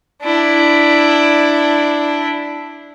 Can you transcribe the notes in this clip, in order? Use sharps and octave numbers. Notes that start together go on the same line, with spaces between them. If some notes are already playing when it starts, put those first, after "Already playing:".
D4 E4